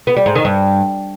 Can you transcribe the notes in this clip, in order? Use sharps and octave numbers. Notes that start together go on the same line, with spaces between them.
B3
G3
G#2
D#3
G2